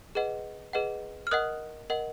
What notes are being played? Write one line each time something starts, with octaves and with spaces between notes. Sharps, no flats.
G#4 B4 D#5 F#5
G#4 B4 D#5 F#5
F6
A#4 D#5 F#5 D#6 F#6
A#4 D#5 F#5